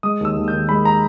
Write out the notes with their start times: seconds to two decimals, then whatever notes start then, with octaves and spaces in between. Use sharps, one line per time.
0.03 G#3 D#6
0.21 D#2 E6
0.36 D#2
0.48 G6
0.53 D#3
0.69 G#3 B5
0.85 A#5